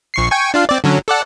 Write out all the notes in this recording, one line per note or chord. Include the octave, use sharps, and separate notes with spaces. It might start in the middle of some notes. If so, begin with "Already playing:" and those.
A#1 C#6 C7
G5 G#5 C#6
D4 F4 F5
C4 D5
D3 F#3 C#4
A4 D5 F#5